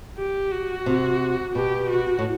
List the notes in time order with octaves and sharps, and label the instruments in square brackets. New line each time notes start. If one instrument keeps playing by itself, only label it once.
[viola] G4
F#4
[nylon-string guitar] C3
[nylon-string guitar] B2 [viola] G4
[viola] F#4
[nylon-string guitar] A2